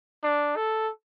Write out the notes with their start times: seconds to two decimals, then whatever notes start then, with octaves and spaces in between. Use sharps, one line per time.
0.23 D4
0.56 A4